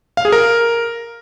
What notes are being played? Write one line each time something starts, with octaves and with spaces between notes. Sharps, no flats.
F5
G#4
A#4